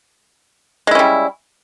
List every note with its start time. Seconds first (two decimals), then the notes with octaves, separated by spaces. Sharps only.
0.87 G#3
0.91 E4
0.95 C#4
0.99 G3